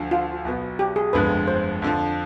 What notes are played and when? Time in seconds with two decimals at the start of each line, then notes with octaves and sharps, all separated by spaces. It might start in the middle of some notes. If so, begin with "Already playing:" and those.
Already playing: D2 D3 F3
0.11 F4
0.45 B1 B2 B3
0.79 G4
0.96 G#4
1.13 G1 F2 D3 G#3 B3 B4
1.47 C5
1.82 F2 D3 F3